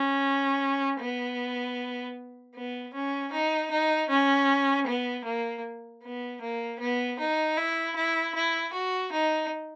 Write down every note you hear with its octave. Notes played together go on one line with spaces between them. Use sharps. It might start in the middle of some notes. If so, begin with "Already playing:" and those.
Already playing: C#4
B3
B3
C#4
D#4
D#4
C#4
B3
A#3
B3
A#3
B3
D#4
E4
E4
E4
F#4
D#4